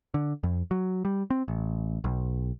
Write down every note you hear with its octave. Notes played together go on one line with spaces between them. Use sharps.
D3
F2
F#3
G3
C4
A1
B1